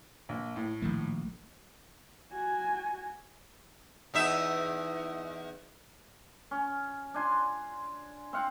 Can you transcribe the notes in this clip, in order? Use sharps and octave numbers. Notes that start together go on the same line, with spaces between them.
A#1
A2
A#1 D#3 A3
F#4 G#5
E2 D#4 E5
C#4
D4 G#5 C6
C4 F5 F#5